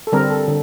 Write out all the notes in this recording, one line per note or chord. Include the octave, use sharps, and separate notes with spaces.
A4
D3 G3 C4 A#4
A4
D3